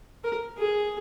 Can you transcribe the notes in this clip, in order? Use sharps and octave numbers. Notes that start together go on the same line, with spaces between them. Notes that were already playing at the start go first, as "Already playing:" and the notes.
A#4
G#4